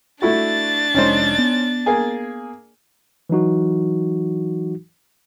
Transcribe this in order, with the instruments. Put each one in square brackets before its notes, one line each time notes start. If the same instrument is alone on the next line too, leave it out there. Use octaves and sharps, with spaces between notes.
[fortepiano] A3 E4 F#4 [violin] D4 A6
[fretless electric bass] F1 G#3 [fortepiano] C#4 D#4 C5
[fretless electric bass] B3
[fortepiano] A#3 G#4 G#5
[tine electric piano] E3 F#3 D#4 F#4